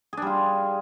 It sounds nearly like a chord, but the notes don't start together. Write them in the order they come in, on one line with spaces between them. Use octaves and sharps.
G#4 D4 G3 F4